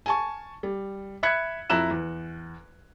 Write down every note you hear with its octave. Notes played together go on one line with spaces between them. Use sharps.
G#5 A5 C#6
G3
E5 B5 F#6 G#6 C#7
F2 E4 A#5 F#6 E7
E2